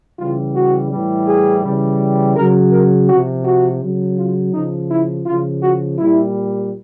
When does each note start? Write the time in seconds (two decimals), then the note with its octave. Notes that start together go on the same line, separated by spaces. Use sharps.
0.19 C#3 E3 G3 F4
0.56 F#4
0.92 A2 E3 G3
1.27 G#4
1.64 C#3 E3 G3
2.36 C#3 F#3 A#4
2.72 A#4
3.08 C3 F3 F#4
3.45 F#4
3.82 C#3 F#3
4.18 F4
4.53 C#3 F3 D#4
4.90 E4
5.26 C#3 F3 F4
5.62 F#4
5.99 A#2 G3 E4